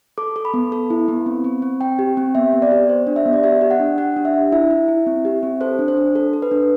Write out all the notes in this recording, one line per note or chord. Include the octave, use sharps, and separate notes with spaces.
A4 D6
A4
B5
B3
A4
E4
B3
C4
C4
C4
C4 G5
G4
C4
B3 E5
B3
D5
G4
G4 C5
D4
E5
B3
D5
G4 E5
G4
F#5
D4
G4 F#5
D4
E5
D4
E4 E5
E4
E4
C4
G4
C4
A4 C5
D4
C5
D4
A4
A4
B4
D4